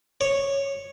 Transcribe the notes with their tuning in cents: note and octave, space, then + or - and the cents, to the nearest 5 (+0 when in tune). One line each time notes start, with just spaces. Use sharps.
C#5 -5